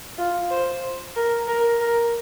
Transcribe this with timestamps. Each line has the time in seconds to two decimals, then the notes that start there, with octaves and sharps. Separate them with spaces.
0.18 F4
0.51 C5
1.16 A#4
1.47 A#4
1.80 A#4